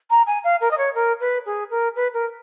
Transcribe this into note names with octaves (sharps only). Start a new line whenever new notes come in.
A#5
G#5
F5
A#4
D#5
C#5
A#4
B4
G#4
A#4
B4
A#4